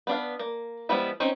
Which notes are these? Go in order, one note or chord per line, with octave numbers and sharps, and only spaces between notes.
B3 D4 F5
A#3
F3 G3 G#3 B3 E4
C4 C#4 D#4 C5 C#5